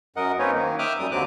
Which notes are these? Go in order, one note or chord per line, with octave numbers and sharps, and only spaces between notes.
F#2 A#4 D#5 F#5
A#3 C4 C#4 D#4 B4 C#5
D#3 A#3
E5 G5 D6 D#6 F6 F#6
F#2 G3 D#6
D#2 D3 F#3 C4 D6 F#6